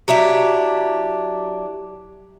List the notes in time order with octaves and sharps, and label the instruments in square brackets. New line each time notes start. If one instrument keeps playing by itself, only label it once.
[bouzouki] F#3 D4 E4 G4